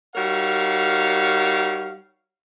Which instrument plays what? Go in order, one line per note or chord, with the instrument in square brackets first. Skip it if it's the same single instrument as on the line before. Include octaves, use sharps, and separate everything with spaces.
[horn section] G3 D#4 F#4 A#4 C#5 F5